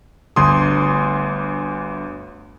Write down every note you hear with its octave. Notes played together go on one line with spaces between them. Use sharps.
G1 D2 C6 D#6